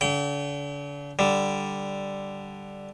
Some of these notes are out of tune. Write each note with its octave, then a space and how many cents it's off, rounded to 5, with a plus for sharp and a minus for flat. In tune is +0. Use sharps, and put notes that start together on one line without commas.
D3 -40 G5 -35
D3 +0 G3 +0